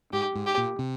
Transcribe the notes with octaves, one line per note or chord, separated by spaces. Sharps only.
G#2 G4
G#2
G4
A#2
C3